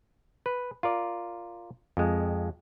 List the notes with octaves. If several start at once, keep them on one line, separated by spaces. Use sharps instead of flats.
B4
F4 A#4 D5
F2 G#3